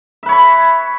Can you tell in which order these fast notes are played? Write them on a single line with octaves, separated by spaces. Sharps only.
E5 B4 C#5 B5